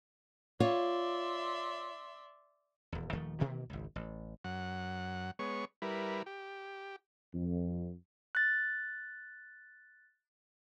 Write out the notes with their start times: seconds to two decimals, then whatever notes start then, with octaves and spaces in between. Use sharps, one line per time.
0.60 F4 C#5 D5 E5 C6
2.92 D#1 E2
3.12 D#1 D#3 F3 A3
3.40 B2 D#3 E3 A#3
3.70 G#1 C#2
3.96 A1
4.45 F#2 F#5
5.39 G#3 B3 C#5 C#6
5.82 G3 E4 A#4 B4
6.26 G4
7.34 F2
8.35 F#6 A6